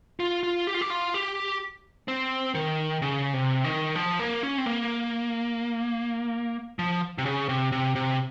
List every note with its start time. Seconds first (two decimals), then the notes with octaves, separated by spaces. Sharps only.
0.20 F4
0.43 F4
0.67 G4
0.74 F4
0.81 G4
0.90 F4
1.14 G4
2.08 C4
2.55 D#3
3.02 C#3
3.34 C3
3.64 D#3
3.96 F3
4.20 A#3
4.43 C#4
4.58 C4
4.66 A#3
6.79 F3
7.18 C3
7.26 C#3
7.49 C3
7.72 C3
7.95 C3